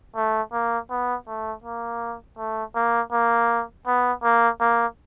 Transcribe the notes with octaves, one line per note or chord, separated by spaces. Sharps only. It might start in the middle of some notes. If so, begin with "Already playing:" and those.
A3
A#3
B3
A3
A#3
A3
A#3
A#3
B3
A#3
A#3